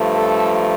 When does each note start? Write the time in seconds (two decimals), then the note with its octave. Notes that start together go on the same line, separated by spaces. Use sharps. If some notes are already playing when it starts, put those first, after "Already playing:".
Already playing: G2 F3 A3
0.17 A4